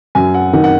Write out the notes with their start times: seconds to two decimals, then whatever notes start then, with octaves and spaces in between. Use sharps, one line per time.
0.15 F#2 G#5
0.34 F#5
0.53 D#3 F#5
0.64 F#5